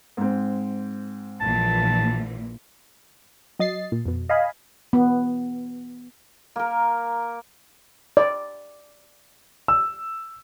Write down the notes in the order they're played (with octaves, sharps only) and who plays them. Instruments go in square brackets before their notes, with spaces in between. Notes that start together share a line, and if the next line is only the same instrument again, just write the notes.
[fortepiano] G#2 C4
[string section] A#1 A#2 E3 [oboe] A5
[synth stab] F#3 D#5 A6 C7
A#2
F2 B2
D#5 F5 G#5 B5
[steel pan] B3
[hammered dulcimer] A#3 A#4
[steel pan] D5
[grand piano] E6